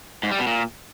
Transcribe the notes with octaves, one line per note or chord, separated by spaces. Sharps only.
G#2
G3
B2
A#2